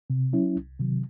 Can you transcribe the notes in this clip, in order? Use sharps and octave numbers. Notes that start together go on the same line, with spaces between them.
C3
F#3 C#4 E4
C2
C3 D#3 F#3